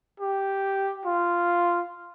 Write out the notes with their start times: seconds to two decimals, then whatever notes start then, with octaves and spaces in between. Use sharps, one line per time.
0.20 G4
1.05 F4